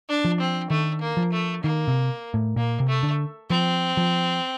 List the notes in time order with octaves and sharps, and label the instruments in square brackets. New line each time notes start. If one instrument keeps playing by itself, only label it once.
[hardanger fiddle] D4
[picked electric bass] F3
[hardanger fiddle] C4
[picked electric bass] D#3 [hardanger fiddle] A3
[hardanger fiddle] A#3
[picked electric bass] F3
[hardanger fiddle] A3
[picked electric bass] D#3 [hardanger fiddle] A#3
[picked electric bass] C3
A2
[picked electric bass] A#2 [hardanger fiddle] A#3
[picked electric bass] C3
[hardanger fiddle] A3
[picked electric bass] D3
[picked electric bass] F3 [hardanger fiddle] C4
[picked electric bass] F3